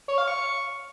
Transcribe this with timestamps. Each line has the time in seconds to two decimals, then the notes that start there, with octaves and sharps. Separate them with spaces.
0.08 C#5
0.18 F5
0.28 C#6